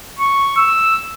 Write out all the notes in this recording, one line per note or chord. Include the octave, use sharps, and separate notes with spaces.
C#6
E6